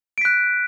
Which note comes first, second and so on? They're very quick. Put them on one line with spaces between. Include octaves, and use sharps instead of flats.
D7 B6 F#6